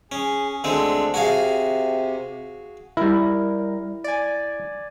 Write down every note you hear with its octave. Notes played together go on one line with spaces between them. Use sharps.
C#4 G#4
D2 G#3 C4 D4
C3 F#4 G#4 F5
G3 E4 A#4
D5 G#5